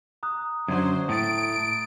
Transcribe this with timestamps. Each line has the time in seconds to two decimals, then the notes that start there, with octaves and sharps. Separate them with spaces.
0.23 A#5 D#6 F#6
0.68 F#2 D3 F#3 C5 G#6
1.09 A2 D#6 A6 D7